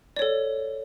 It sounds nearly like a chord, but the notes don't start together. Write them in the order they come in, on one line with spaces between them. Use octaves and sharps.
D5 C#5 A4